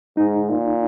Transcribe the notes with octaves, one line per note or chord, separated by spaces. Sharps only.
G#2 D#4
A#2